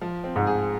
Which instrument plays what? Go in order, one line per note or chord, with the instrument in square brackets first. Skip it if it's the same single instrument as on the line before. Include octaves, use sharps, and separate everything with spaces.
[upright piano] F3
C4
[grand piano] G#2
[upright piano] G#4